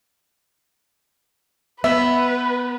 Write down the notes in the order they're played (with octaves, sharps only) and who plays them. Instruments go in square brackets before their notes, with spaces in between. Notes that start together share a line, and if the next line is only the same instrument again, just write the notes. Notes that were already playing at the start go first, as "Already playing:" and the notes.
[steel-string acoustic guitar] B3 [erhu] B4 [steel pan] E5